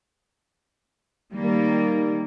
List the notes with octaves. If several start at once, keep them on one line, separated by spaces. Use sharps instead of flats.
D#3 G3 A#3